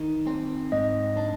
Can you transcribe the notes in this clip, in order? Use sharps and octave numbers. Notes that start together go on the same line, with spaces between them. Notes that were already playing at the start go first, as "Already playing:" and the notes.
Already playing: D#3
C4
G#2 D#5
D4